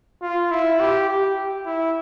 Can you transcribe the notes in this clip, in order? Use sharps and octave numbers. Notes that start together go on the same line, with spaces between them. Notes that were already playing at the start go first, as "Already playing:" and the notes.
F4
E4
G4
G4
E4